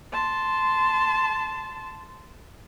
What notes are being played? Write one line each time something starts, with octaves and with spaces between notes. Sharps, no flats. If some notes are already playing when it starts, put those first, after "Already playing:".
A5 C6